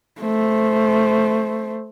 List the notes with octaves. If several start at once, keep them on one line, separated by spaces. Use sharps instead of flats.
A3 C5